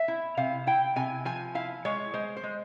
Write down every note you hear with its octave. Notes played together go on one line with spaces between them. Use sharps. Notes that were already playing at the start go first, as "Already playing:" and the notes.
Already playing: E5
E4
C3 F5
E4 G5
C3 G#5
F3 G#5
E4 F5
G#3 C#5
G#3 C5
C5
G#3